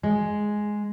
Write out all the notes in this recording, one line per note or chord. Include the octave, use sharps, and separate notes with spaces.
G#3